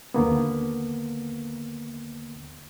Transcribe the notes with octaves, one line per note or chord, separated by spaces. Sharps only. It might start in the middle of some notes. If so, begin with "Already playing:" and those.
D#2 D3 A#3 B3